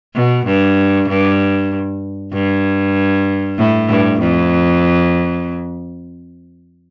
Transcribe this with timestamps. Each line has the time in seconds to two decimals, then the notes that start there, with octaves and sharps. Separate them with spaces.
0.15 B2
0.46 G2
1.08 G2
2.33 G2
3.58 A2
3.89 G2
4.20 F2